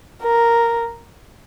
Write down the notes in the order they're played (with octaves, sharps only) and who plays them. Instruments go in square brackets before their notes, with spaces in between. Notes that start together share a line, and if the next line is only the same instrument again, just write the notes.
[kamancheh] A#4